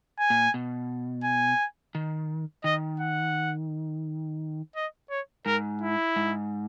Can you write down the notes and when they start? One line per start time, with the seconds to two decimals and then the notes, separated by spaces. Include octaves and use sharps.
0.19 G#5
0.30 A#2
0.54 B2
1.24 G#5
1.95 D#3
2.64 D#3 D#5
3.00 F#5
4.76 D#5
5.10 C#5
5.46 G#2 A#4
5.81 E4
6.16 G#2